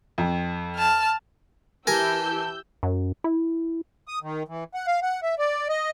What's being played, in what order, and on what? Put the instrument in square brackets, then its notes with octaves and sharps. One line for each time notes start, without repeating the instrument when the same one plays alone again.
[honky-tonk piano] F2
[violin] A5 F6
[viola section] E3 G4 [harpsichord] A#4 G#5 [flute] A5 [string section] E6 G6
[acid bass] F#2
E4
[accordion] D#6
D#3
E3
F#5
F5
F#5
E5
D5
D#5